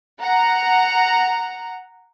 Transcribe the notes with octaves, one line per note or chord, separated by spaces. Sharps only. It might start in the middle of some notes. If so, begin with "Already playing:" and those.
F#5 A#5